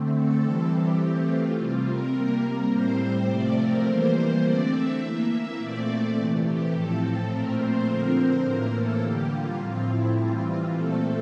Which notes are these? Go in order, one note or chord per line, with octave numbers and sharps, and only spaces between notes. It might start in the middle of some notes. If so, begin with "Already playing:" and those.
Already playing: D3 A3 C4
A4
E3 G3 C4
G4
E3 A3 C4
F4
C3 G3 C4
A#4
C3 G3 A#3
A2 G3 C4 C5
C3 F3 A3 C4 D5
A#4
E3 G3 A#3 C5
D3 A3 C4 D5
E5
E3 A#3 E5
E5
A#2 A3 C4 D5
C3 E3 A3
G4
A2 F3 C4 A4
A4
A#2 F3 A3 C4 A#4
C5
D3 F3 C4 A#4
C5
A2 E3 A#3 A#4
A4
D3 G3 A#3 G4
F4
A2 F3 C4 F4
E4
E3 G3 C4 F4
F4
A#2 A3 C4 A4